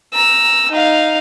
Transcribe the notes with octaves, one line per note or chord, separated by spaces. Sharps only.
A#5 E6
D#4 F5